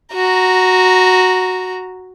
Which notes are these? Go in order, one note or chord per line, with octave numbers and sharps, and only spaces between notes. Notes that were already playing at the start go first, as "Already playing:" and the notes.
F#4 A#5